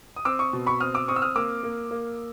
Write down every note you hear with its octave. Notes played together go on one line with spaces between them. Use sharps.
D#6
C4 D6 E6
C#6 D#6
B2
B5 C#6
C4 D#6 F6
D6 E6
C4 C#6 D#6
E6
D#6 F6
A#3 D6 E6
A#3
A#3